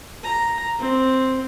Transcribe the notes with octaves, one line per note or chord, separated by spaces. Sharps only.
A#5
C4